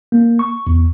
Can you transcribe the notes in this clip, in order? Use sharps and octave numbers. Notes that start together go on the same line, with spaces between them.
A#3
C#6
E2